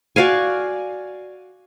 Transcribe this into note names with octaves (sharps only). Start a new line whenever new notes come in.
F#4 D5 F5 G#5